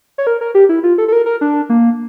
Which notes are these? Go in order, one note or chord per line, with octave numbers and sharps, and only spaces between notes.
C#5
A#4
A#4
G4
E4
F4
A4
A4
A#4
A#4
D4
A#3